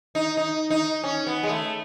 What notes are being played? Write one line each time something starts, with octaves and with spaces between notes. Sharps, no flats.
D#4
D#4
D#4
C#4
B3
G#3
A3